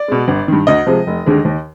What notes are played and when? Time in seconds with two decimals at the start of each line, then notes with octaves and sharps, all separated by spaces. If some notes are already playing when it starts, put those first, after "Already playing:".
Already playing: D5
0.08 B2 G#3
0.28 G1
0.48 G2 D#3
0.67 D2 D#5
0.87 C3 F3 G#3
1.07 F1
1.26 D#2 D3 G#3
1.45 D#2